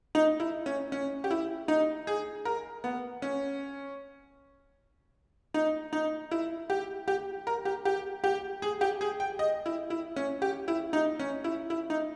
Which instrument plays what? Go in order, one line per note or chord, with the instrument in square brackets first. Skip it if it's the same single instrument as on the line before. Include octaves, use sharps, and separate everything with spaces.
[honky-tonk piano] D#4
E4
C#4
C#4
G4
E4
D#4
G#4
A#4
B3
C#4
D#4
D#4
E4
G4
G4
A#4
G4
G4
G4
G#4
G4
G#4
G5
D#5
E4
E4
C#4
G4
E4
D#4
C#4
E4
E4
D#4